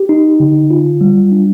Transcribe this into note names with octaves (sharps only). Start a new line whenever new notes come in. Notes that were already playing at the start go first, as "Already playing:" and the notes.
Already playing: G4
D#4
D3
F4
G3
D4